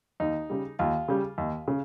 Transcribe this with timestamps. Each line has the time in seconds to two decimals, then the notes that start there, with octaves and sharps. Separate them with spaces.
0.20 D#2 D#4
0.50 C#3 G3
0.79 D#2 F4
1.08 C#3 G3
1.38 D#2
1.68 C#3